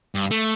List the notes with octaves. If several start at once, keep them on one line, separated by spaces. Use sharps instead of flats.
G2
A3